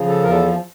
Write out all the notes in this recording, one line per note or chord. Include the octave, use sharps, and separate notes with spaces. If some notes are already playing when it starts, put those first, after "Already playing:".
Already playing: C#3 F3
A4
E2 A#4
A4